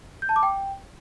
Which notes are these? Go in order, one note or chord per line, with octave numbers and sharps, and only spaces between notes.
G6
A5
D6
G5